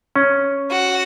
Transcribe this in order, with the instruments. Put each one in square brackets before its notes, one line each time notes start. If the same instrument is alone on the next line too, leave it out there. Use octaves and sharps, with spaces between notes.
[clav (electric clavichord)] C#4
[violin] F#4